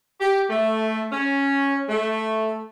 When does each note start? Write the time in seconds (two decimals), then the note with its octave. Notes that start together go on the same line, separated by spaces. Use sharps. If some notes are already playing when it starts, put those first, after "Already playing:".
0.21 G4
0.50 A3
1.12 C#4
1.89 A3